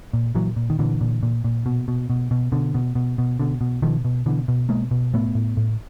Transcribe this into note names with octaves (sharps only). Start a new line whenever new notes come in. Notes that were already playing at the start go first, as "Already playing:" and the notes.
A#2
A#2 E3 F#3
A#2
D#3
A#2 D3 E3
A#2
A#2
A#2
B2
B2
B2
B2
B2 D3
B2
B2
B2
B2 D3
B2
B2 D#3 F3
B2
B2 D3 E3
B2
B2 G#3 A#3
B2
A2 A3 B3
A2
A2